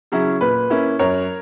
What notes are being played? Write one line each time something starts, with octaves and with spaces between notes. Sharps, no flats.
C#3 F#3 C#4 E4
A#2 B4
A#3 C#4 E4
F#2 A#4 C#5